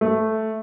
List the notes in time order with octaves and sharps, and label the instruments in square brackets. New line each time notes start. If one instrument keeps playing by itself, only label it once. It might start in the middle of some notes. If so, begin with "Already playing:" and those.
[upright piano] A3